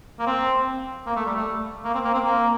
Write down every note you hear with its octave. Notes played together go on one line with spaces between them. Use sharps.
A#3
C4
A#3
A3
G3
A3
A#3
C4
A#3
C4
A#3